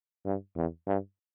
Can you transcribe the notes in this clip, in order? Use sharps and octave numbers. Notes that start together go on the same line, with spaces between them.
G2
E2
G2